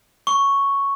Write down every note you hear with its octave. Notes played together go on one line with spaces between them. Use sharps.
C#6